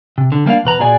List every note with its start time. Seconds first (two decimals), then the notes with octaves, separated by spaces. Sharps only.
0.18 C3
0.32 D3
0.46 G3 A#3 D4 F5
0.64 E2 B2 B4 A#5
0.80 A#2 F#4 G#4 D5 G#5